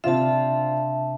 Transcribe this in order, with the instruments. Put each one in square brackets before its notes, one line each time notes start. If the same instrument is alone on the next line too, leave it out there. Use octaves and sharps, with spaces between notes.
[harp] C3 D4 [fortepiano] C4 F4 [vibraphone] E5 A5